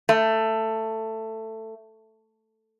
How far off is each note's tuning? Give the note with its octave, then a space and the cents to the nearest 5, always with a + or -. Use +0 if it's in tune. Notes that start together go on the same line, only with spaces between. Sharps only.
A3 +15